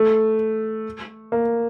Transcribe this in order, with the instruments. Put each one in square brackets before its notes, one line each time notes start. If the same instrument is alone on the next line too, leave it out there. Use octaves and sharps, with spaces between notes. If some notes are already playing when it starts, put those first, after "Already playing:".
Already playing: [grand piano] A3
A#3